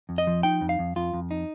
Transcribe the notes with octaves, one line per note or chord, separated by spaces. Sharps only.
F2
D#5
F3
D#4 G5
F2
F5
F2
F2 F4
F2
D#4